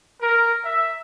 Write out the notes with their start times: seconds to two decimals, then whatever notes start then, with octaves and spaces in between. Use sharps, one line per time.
0.21 A#4
0.64 E5